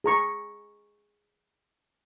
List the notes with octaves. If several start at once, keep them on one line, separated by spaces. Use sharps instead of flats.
G#4 A#5 C#6